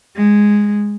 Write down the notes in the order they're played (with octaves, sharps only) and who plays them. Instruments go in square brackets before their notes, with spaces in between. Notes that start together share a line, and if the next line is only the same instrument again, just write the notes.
[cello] G#3